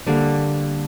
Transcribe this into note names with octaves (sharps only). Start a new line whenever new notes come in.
D3 G3 A#3